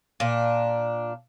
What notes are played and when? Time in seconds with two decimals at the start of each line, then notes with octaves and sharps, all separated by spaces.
0.20 A#2 D4